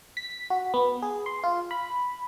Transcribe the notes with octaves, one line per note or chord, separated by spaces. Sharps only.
B6
F#4
B3
G#4
C6
F4
B5